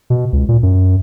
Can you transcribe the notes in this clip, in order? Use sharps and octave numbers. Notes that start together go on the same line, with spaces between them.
B2
C#2
A#2
F#2